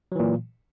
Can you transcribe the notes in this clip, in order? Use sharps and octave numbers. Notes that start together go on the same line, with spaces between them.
A#2 E3 F#3